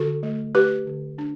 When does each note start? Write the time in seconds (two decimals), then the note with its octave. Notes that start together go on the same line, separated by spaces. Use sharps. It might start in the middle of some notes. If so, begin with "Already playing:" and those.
Already playing: D3 F#4 A4
0.23 A3
0.55 A3 G4 B4
0.87 D3
1.18 D4